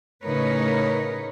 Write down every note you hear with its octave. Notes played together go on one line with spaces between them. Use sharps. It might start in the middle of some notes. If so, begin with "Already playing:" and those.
A2 C#3 D#4 A#4 B4 C#5